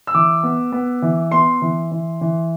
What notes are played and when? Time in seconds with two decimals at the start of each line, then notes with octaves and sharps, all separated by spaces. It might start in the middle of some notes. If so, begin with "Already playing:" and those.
0.07 E6
0.14 E3 D6
0.43 B3
0.72 B3
1.02 E3
1.31 B3 C6
1.62 E3
1.92 E3
2.21 E3